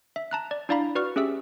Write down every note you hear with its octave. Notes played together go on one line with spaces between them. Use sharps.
E5
A5 A#5 F#6
D5
D4 E4 D5 F5 A#5 B5
F#4 B4 D5 C#6 F6
C#4 G4 G#4 E5 E6